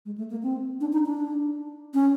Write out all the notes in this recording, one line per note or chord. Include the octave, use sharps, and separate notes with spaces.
G#3
A3
A#3
C4
D4
D#4
D4
C#4